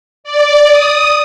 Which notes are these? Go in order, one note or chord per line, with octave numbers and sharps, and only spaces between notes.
D5
D#6